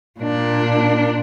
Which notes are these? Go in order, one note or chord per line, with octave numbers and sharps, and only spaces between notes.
A#2 D4